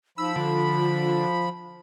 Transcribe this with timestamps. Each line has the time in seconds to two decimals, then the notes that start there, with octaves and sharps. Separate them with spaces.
0.18 F3 D#4 B5 E6
0.36 D3 F4